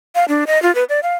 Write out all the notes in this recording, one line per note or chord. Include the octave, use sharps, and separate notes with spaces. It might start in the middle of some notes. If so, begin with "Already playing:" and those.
F5
D4
D#5
F4
B4
D5
F5